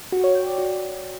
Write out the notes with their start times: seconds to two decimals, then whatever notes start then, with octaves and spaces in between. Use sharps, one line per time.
0.12 F#4
0.24 C#5
0.35 G5
0.47 D5
0.58 F#4